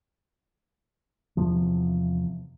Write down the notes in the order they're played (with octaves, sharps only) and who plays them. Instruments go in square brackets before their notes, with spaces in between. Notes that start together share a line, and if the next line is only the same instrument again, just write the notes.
[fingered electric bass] E2 C3 F3